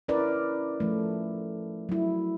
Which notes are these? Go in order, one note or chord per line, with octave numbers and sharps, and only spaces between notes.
C#4 E4 A#4 B4 D5
F3 A3
F#3 E4